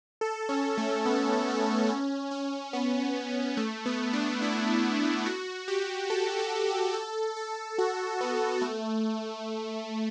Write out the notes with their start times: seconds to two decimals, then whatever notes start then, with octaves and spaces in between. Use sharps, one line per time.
0.21 A4
0.49 C#4
0.78 A3
1.05 B3
1.48 A3
1.89 C#4
2.31 C#4
2.73 B3
3.57 A3
3.86 B3
4.13 D4
4.42 E4
5.26 F#4
5.68 G4
6.10 A4
6.38 A4
6.66 G4
6.93 A4
7.36 A4
7.78 F#4
8.21 B3
8.61 A3